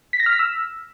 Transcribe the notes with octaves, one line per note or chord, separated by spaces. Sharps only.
B6
A#6
F6
B6
E6